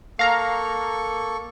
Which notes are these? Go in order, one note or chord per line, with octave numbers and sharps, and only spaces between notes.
A#3 A4 F5 A#5 C#6